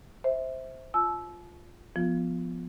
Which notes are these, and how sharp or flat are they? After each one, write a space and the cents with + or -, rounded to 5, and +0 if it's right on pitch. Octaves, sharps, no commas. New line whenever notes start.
C5 +0 E5 -15
F4 +0 A5 -40 E6 +0
F3 -5 B3 +0 F4 +0